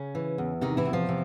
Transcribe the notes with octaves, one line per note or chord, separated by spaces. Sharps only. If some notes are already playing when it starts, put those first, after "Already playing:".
Already playing: C#3 C#4
E3
E2
C3 D#3 D#4
E3 E4
E2
F3 F4
C3